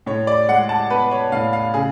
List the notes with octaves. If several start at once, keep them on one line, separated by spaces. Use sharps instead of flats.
A2 C#5
D5
G#3 F#5
A5
B3 B4
C#5
A2 F5
F5
C#3 G#4